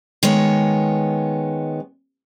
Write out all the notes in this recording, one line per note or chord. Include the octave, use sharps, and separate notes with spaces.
D#3 G#3 B3 C#5